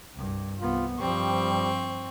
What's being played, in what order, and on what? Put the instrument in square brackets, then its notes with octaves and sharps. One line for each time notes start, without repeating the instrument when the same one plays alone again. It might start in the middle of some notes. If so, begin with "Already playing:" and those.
[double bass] C2 G2
[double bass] C2 B3 [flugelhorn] F4
[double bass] G2 F3 [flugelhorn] G3 [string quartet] C4 C#6